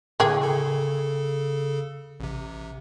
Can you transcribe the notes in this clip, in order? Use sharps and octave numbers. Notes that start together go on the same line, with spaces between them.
A2 D3 A#3 G#4 G5
C#3 A4
A1 C3